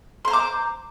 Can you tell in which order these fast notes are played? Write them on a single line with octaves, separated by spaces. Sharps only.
C6 C5 A#5 D6